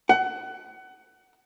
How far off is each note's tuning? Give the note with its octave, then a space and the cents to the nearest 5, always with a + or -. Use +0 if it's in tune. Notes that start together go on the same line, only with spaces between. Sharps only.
F#5 +25